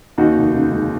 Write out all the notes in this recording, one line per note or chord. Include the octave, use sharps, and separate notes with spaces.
D#2 D#4 F#4
F1
C#3
G#3